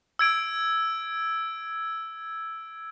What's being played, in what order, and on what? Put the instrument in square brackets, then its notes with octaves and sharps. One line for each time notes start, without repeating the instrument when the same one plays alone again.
[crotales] E6 G#6 D7